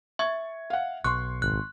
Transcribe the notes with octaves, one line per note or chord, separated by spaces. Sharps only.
E5 C#6 G#6
F5 F#5
B1 C6 C#6 F#6
G#1 F#6